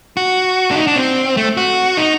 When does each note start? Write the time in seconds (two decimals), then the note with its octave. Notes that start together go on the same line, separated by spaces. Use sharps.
0.17 F#4
0.71 D4
0.76 D#4
0.87 D4
0.96 C4
1.37 A3
1.57 F#4
1.97 D#4